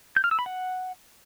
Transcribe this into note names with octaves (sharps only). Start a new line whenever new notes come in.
G6
F6
E6
B5
F#5